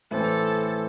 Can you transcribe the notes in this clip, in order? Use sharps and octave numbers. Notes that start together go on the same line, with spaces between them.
A2 E3 C4 A4